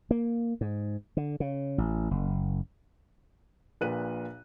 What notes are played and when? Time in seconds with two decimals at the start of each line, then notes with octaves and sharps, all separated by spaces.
0.11 A#3
0.61 G#2
1.17 D3
1.40 C#3
1.78 A1
2.11 F#1
3.81 A#1 A#2 B4 F#6 D#7